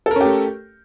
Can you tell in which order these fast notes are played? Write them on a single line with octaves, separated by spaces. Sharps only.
A4 A#4 C#4 G4 A3